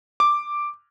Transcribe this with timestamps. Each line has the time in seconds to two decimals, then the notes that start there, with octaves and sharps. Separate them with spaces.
0.20 D6